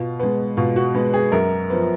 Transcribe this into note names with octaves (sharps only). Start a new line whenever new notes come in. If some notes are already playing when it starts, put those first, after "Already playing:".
Already playing: B2 F4
G#3 B3
B2 F4
F#4
G#3 B3
G#4
F#2 A#4
F3 B3